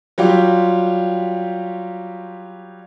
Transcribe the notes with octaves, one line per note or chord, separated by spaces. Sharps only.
F#3 G3 F4 G4